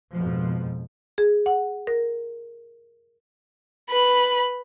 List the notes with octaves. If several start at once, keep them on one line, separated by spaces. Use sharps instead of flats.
F2 G#2 B2 F3
G#4
F#5
A#4
B4 B5